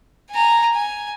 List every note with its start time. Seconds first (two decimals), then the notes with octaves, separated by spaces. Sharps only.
0.31 G#5 A#5
0.73 G#5